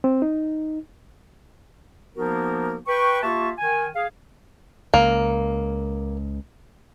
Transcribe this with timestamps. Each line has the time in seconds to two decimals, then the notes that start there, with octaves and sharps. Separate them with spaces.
0.04 C4
0.22 D#4
2.16 F3 A#3 B3 D#4 F#4 A#4
2.87 B4 G5 C#6
3.22 A#3 F4 G4 E5 A5 C#6
3.58 D#3 G#5
3.95 G#4 F5
4.94 C#2 A#3